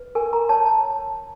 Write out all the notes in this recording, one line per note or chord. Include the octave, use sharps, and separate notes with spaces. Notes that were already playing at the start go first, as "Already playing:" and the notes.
Already playing: B4
A#4 G#5
A#5
C#5 A5
A5